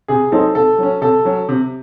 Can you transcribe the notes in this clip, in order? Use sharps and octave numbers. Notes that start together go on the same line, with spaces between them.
C3 G#4
F#3 C4 D#4 A4
C3 A4
F#3 C#4
C3 A4
F#3 C#4
C3